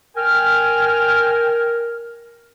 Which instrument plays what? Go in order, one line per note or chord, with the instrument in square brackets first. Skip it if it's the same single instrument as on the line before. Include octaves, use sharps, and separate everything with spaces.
[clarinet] A#4 [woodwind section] G5 G#5 F6